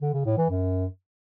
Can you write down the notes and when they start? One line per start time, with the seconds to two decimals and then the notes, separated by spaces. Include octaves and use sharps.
0.02 D3
0.14 C#3
0.25 A2
0.37 E3
0.49 F#2